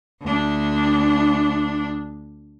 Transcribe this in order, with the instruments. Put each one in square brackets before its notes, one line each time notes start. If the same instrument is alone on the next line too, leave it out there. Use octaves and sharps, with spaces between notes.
[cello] D2 D4